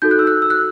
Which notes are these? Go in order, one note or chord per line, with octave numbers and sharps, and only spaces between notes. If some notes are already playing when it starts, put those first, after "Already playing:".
D#4 F#4 A4 G6
F#6
E6
F#6
E6
F#6